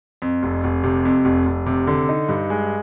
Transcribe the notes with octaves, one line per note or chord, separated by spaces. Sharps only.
F2
F1
F1
C3
F2
F1
F1
C3
D3
D#4
G2
G#3